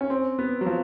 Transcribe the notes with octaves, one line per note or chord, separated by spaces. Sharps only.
C#4
C4
B3
F#3
F3